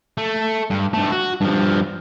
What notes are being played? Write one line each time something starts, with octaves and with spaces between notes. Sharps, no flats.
A3
G2
G2 A3
F#4
G2 F3